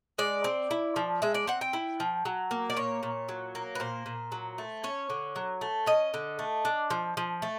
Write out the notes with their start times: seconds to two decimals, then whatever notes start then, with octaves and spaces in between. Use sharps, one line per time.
0.18 G#3 D5
0.44 C4
0.71 E4
0.96 F3
1.22 G#3 E5
1.34 D5
1.47 C4 F#5
1.61 G5
1.73 E4
2.00 F3
2.25 F#3
2.51 A#3
2.70 D5
2.77 A#2 C#5
3.03 A#2
3.29 F#3
3.55 A#3
3.75 B4
3.80 A#2 C5
4.06 A#2
4.32 F#3
4.58 A3
4.84 C#4 C#5
5.10 D3
5.36 F#3
5.61 A3
5.86 C#4 D#5
6.14 D3
6.39 A3
6.65 D4
6.90 F3
7.17 F3
7.42 A3